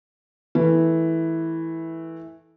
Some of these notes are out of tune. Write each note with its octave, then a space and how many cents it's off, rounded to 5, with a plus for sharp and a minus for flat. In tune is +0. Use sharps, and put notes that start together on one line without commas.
E3 -10 A3 -10